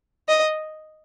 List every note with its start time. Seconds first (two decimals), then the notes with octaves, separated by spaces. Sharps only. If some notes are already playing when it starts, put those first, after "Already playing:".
0.29 D#5